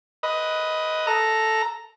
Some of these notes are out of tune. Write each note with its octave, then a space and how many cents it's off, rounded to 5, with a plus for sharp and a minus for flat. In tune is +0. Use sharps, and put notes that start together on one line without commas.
B4 +0 D#5 +15
A4 +0 A#5 +0